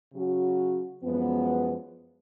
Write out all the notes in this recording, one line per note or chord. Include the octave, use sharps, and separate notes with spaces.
C#3 F#3 C#4 F#4
F#2 F3 G#3 B3